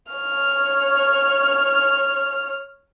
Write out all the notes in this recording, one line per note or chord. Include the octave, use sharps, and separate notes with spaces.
C#5 F6